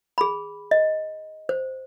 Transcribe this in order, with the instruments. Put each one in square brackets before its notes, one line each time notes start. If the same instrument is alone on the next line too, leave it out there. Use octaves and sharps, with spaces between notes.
[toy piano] G#4 B5
D#5
C5